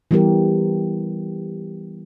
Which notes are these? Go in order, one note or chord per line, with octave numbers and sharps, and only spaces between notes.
E3 G3 B3 G4 A#4